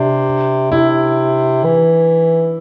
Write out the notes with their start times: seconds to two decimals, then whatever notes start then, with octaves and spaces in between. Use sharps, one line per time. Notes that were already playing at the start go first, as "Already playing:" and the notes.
Already playing: C3 D4
0.72 C3 E4
1.64 E3